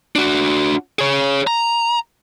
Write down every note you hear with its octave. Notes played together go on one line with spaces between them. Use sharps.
D4 F#4
G#4 C#5
A#5